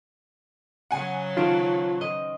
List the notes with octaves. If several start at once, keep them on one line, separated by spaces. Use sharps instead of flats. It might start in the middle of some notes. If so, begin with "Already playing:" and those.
C#3 F#3 F#5 G#5
D#3 C#4 F4 C5 A5 D7
D#5